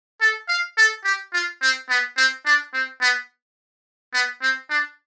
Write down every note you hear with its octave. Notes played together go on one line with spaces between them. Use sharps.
A4
F5
A4
G4
F4
C4
B3
C4
D4
C4
B3
B3
C4
D4